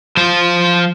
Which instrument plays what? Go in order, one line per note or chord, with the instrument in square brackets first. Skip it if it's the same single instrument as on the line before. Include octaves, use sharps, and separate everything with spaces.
[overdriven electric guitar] F3 C5